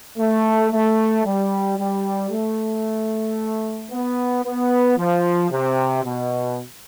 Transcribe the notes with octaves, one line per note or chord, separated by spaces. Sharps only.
A3
A3
G3
G3
A3
B3
B3
F3
C3
B2